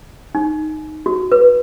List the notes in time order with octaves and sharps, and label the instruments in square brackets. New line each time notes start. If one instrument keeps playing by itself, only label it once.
[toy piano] D#4
F#4
B4